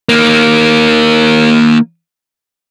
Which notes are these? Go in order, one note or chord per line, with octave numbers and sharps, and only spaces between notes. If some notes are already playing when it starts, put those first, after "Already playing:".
D#3 A#3